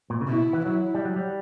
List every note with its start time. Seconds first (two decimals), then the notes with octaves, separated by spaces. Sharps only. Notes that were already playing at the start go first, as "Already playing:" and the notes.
0.10 A#2
0.21 C#3
0.28 B2 E4
0.53 E3
0.65 F#3 E4
0.94 G3
1.05 F#3
1.16 G3